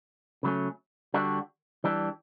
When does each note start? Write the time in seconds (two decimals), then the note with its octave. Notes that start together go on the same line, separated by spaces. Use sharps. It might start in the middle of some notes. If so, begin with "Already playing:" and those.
0.43 C#3 F#3 A3 C#4
1.14 D3 G3 D4 F#4
1.84 E3 G3 D4